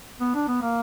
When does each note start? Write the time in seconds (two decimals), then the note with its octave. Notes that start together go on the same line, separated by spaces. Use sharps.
0.21 B3
0.34 D4
0.48 B3
0.62 A#3